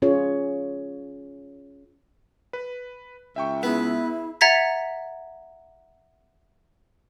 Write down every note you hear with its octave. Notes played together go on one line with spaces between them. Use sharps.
C#4 F4 G#4 C#5
B4
C#2 E5 G5 C#6
B3 E4 G#4 E5
E5 F#5 A#5 G#6 A6 B6